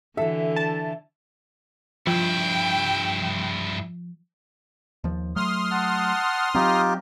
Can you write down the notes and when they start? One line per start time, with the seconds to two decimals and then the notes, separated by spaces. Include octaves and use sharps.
0.17 D3 E3 F#4 A4 E5
0.56 A5
2.07 G2 F3 E4 G5
5.04 D#2 F3
5.36 F#3 A3 C6 D#6 F6
5.71 F#5 A5
6.55 F#3 C4 D#4 F4 G4